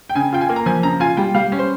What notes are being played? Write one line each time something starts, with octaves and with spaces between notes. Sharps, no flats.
G5
C#3 G#5
F4 G5
G#5
A#3
A#5
F3 G#5
C#3 A#5
F4 G#5
G3 G5
G3 F5
C#4
C5